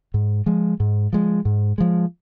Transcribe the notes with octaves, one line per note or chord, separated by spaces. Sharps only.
G#2
F3 G#3
G#2
F3 G#3
G#2
F3 G#3